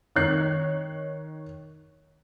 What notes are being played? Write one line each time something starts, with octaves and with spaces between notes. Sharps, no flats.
D#3 C#5 F#6 C7